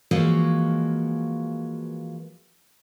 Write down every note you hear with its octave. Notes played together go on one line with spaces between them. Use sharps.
E3 F3 G#3 A#3 F#4 C#5